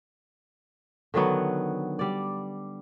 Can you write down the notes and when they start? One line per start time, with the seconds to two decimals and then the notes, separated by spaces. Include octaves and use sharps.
1.14 D3 D#3 F#3 B3
1.99 G3 D5